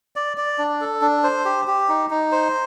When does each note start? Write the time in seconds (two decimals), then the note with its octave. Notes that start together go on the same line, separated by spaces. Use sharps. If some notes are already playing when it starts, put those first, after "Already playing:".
0.16 D5
0.37 D5
0.58 D4
0.81 A4
1.02 D4
1.23 C5
1.45 G4
1.67 G4
1.89 D#4
2.10 D#4
2.32 C5